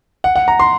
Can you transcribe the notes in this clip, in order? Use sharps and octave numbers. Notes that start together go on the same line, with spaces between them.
F#5
F#5
A#5
C6